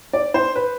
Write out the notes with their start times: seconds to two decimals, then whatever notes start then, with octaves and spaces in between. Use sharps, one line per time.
0.13 D5
0.34 C5
0.56 B4